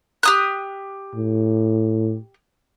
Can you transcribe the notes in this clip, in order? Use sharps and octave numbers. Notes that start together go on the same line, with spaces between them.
G4 D#6 F#6
A2